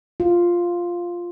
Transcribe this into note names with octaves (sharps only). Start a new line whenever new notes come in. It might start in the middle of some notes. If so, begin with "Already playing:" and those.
F4